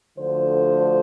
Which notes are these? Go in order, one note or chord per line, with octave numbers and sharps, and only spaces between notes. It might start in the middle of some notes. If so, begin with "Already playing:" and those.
D2 D3 F3 C5